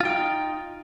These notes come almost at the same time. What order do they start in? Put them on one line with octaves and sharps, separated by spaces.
F4 G5 D#4